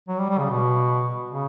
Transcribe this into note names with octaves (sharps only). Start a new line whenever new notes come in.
F#3
G3
G3
C#3
B2
C#3